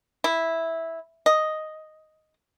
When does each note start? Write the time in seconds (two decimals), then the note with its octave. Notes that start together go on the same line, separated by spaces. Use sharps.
0.24 E4
1.26 D#5